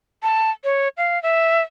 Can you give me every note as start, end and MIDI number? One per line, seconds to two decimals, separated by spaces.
0.23 0.51 81
0.64 0.88 73
0.97 1.21 77
1.23 1.61 76